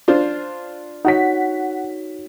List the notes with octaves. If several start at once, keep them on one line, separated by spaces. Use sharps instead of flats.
D4 F4 C5
D#4 F#4 C#5 F#5 B6